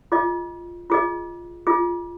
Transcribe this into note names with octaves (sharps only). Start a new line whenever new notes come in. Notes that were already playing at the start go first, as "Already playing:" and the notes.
F4 G#4 D#5
F4 G#4 D#5
F4 G#4 D#5